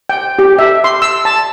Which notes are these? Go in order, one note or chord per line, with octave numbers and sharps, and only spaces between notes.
G5
G4
E5
C6
E6
A5